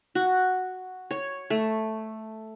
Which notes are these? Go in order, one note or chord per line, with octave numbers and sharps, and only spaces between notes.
F#4
C#5
A3